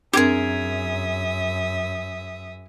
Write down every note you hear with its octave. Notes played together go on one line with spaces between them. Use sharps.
F#2 C4 D4 G4 G#4 A#4 E5 D#6